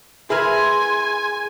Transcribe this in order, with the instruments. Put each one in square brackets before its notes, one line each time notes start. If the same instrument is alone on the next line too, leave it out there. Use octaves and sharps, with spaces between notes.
[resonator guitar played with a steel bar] E4 A#4 B4 [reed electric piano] G#4 [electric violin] G#5 [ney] C6